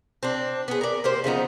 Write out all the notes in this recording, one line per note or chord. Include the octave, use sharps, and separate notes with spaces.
C4 D4
B3 G#4
A#4 D5
A#3 G4 C5
C#3 F3 B3 D#4